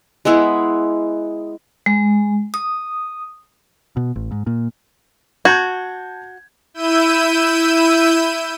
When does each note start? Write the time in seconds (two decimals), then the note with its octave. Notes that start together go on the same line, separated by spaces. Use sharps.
0.25 G#3 B3 E4 G#4
1.86 G#3
2.54 D#6
3.97 B2
4.16 A1
4.31 G#2
4.47 A#2
5.45 F#4 A5 G6 G#6
6.74 E4 E6 G6 D#7